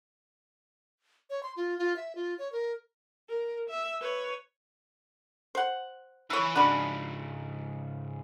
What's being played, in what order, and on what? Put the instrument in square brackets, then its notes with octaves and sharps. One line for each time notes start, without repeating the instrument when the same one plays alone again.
[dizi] C#5
C6
F4
F4
E5
F4
C#5
A#4
[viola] A#4
E5
B4 C#5
[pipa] C5 F#5
[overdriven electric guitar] E3 B4 [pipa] E4 C#5
[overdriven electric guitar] G#2 C#3 [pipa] D4 F#4 B5